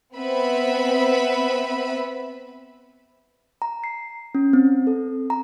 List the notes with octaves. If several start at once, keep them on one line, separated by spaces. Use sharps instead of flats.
B3 C4 B4 E5 B5
A#5
C7
C#4
C4
A4
A#5